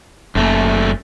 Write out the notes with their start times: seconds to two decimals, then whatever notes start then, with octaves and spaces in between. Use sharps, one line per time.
0.35 F#1 F#2 A3 A#3